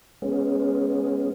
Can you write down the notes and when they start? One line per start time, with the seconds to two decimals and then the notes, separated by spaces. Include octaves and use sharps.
0.22 G#3 B3 C#4